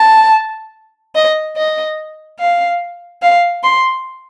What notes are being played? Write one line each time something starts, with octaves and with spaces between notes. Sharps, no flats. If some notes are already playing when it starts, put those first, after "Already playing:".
Already playing: A5
D#5
D#5
F5
F5
C6